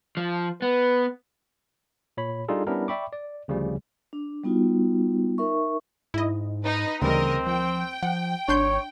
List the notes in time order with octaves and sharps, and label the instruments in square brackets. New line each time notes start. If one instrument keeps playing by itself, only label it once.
[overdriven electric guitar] F3
[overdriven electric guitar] B3 [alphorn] B4
[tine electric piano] A#2 C#5 B5
G3 D4 D#4 F4 G#4 A4
G3 B3 C#4 D4 E4 A#4
D5 E5 G5 B5 C#6 D6
D5
D2 C#3 F3 G3
[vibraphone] D4
G3 B3 D#4 F4 F#4
D#4 A#4 E5 C#6
[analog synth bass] G#2 [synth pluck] E4 D#5
[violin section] D#4 B4
[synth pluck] D2 E3 G3 [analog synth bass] C#3 [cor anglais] C4 [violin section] A#4 D#5
[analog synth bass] F3 [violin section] G5
[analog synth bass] F3 [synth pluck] F#5
[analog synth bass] G#1 [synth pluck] D4 C6 G6 [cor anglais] C#5